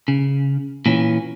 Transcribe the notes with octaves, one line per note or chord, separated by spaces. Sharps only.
C#3
A#2 E3 C#4